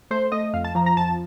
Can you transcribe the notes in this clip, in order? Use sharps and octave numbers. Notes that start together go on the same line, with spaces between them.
A3 C5
A3 D#5
F2 F5
A5
F3 A#5
A#5
F2 A5